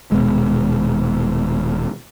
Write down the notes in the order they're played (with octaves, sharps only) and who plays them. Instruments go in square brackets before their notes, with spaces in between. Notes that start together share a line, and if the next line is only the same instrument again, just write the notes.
[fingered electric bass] D#1 B2 G#3